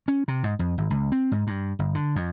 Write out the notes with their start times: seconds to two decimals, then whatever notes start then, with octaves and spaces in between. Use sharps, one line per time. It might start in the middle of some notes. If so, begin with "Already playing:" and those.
0.08 C#4
0.28 C3
0.43 G#2
0.59 F2
0.78 G#1
0.90 C#2
1.12 C4
1.32 G#2
1.47 G2
1.79 G1
1.95 D3
2.16 F2